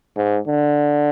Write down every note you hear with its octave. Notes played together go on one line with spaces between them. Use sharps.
G#2
D3